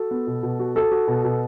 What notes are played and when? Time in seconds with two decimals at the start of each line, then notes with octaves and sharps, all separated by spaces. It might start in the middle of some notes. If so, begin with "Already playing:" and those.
Already playing: F#4 A4
0.11 B3
0.27 B2
0.43 B2
0.59 F#4
0.75 F#4 A4
0.91 F#4
1.08 B2
1.24 B2